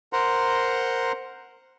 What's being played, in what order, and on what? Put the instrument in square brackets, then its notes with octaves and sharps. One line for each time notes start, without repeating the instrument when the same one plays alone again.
[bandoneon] A#4 C5 F#5 A#5 C6